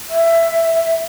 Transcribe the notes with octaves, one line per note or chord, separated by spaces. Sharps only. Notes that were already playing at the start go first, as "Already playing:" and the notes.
E5